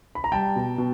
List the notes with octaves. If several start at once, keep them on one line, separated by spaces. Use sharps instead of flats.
B5
A#5
G3 G5 A5
B2
B2